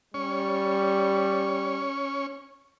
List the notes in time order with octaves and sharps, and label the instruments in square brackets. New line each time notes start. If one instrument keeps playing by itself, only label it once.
[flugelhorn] G3 [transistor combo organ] C#4 C#6